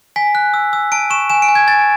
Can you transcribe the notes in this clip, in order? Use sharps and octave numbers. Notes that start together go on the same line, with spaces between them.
G#5 B6
F#6
E6
E6
A5 D7
C#6 E7
G#5 E7
D7
G#5
G#6
G#5 A6